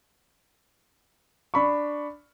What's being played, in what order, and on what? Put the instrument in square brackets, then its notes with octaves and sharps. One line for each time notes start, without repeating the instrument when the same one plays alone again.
[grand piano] D4 B5 C#6